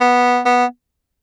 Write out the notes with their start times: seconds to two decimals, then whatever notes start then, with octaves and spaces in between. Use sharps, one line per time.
0.01 B3
0.45 B3